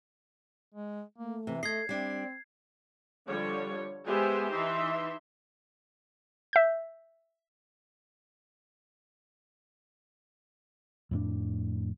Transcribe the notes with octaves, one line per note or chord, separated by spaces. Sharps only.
G#3
A3 A#3
C3 E3
A3 A4 D#5 G#6 C7
G3 C4 D4 D5
D3 F3 G3 C#5
G#3 B3 G4 C5 E5 G#5
E3 D#4 E5 C6
E5 G6
F2 A2 D4